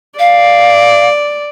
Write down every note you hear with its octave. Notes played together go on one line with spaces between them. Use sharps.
D5 F5